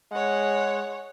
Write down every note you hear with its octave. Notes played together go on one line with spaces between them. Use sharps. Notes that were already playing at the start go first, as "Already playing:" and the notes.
G#3 C#5 F#5